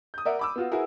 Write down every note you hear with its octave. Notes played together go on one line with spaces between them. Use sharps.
D#6 G6
A#4 D5 E5 F#5
B5 D6 E6
B3 F4 F#4
E4 F#4 G#4 A#4 B4